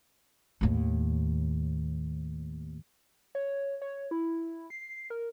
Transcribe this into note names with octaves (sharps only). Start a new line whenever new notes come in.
D#2 A2
C#5
C#5
E4
C7
A#4